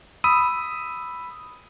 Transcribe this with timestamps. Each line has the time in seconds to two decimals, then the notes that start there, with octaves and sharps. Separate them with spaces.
0.24 B5 D#6 E6 D#7